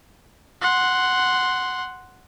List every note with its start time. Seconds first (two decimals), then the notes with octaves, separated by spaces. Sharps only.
0.62 F#5 C6